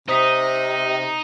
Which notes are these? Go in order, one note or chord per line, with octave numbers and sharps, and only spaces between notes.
C3 D#4 C5 D#6 B6